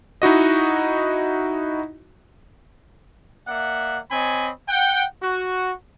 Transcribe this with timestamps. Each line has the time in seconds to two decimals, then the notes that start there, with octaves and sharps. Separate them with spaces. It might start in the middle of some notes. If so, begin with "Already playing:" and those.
0.22 D#4 E4 F#4 D#5
3.48 A#3 D5 E5 F#5
4.11 C4 C#5 D#5 G#5 B5
4.69 F#5 G5
5.23 F#4